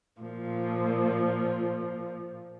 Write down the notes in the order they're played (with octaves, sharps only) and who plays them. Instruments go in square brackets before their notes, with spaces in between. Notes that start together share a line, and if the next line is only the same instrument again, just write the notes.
[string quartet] A#2 F3